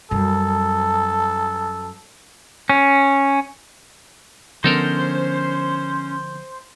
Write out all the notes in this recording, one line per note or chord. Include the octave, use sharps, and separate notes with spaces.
F#2 G3 A4
C#4
D3 F3 B3 C#4 D#4 A4 A#4 C5